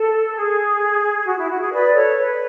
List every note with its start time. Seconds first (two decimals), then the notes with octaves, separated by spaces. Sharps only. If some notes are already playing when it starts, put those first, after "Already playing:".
Already playing: A4
0.35 G#4
1.27 F#4
1.38 E4
1.49 F#4
1.60 G#4
1.72 B4 D5
1.95 A4 C#5
2.18 B4